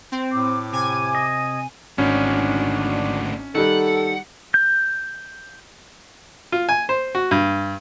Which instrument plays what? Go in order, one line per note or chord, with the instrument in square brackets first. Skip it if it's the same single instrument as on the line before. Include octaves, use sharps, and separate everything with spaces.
[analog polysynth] C4
[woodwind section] A2 D6
[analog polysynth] C3 G#5 D#7
[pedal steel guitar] D#5
[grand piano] G#1 [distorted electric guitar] D2 D#3 [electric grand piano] C#4 [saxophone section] D4
[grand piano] D#3 G3 [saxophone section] A4 [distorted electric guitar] F#5
[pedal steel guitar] G6
[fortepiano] F4
G#5
C5
F#4
G2